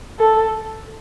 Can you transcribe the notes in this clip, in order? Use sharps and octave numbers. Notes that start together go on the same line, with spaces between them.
A4